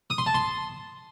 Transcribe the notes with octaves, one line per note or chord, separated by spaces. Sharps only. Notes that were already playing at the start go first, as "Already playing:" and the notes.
D#6
C6
A5
C6